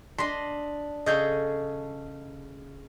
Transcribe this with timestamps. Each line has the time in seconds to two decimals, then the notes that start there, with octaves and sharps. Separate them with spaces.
0.18 D4 D#5 C6 B6
1.06 C#3 G#4 A4 D#5 G6